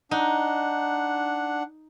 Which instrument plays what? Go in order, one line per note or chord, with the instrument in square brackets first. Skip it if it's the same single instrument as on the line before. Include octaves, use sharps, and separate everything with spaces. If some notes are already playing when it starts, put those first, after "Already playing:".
[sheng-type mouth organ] D4 F#5 [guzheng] D#4